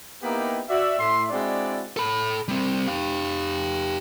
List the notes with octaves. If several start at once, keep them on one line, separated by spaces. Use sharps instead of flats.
A#3 B3 D#4 E4 G4
F#4 D5 E5
A2 E5 C6
G#3 C4 D4 E4 F#4 D5
A4 B5
G3 C4
G4 F5